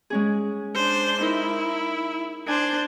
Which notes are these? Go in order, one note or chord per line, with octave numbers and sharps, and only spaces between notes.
G#3 C#4 G#4
D4 C5
D#4 E4 A#4
D4 C5 G#5